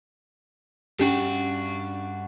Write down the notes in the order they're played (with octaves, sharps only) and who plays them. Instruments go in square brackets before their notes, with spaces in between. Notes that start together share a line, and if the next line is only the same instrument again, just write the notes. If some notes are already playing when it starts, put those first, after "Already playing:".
[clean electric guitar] G2 D4 F#4 [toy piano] C#4 G4